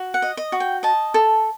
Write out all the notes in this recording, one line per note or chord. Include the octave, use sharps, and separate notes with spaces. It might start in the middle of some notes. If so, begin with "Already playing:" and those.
Already playing: F#4
F#5
D#5
D#5
F#4
G5
D#5 A5
A4